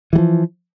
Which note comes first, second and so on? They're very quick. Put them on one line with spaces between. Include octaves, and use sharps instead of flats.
E3 G3 F3